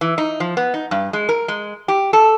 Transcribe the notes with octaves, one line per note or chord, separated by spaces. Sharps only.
E3
D#4
F3
B3
D#4
G2
G#3
A#4
G#3
G4
A4